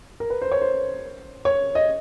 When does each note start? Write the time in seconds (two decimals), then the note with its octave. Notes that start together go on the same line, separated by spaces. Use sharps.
0.20 A#4
0.30 B4
0.42 C5
0.52 C#5
0.62 C5
1.45 C#5
1.75 D#5